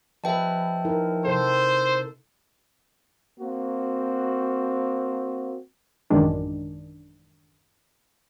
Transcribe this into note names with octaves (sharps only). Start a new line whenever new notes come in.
F3 G4 B4 D#5 E5 G5 A5
D#4 E4 A#4
C3 A4 C5
A#3 C4 F#4
A1 F#2 D#3 G#3 D4